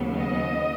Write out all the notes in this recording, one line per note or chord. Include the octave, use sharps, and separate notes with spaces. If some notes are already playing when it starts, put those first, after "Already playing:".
Already playing: D#2 C#3 F#3 B3
D#5